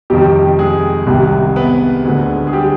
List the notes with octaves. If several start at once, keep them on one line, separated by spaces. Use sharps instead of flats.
F2 C3 D#3 G3 G4
G#3 G#4
C2 C3 D#3 G3
B3 B4
D2 D3 G#3
G#4
G3 G4